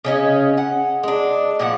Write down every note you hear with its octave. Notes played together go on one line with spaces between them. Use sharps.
C#3 C#4 D#5
F#5
G#3 D4
A#2 F3 G4 F#5